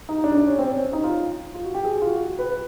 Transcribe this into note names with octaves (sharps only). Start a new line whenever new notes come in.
D#4
D4
D4
C#4
C4
C#4
D#4
F4
F4
F#4
G4
G#4
F4
F#4
B4